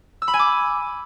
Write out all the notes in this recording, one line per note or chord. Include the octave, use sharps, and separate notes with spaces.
E6
B5
G#5
D6